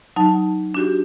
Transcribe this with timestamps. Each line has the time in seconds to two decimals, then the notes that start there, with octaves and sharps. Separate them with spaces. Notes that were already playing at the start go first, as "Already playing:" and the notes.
0.16 F#3 D#4 A5
0.74 D4 F#4 G4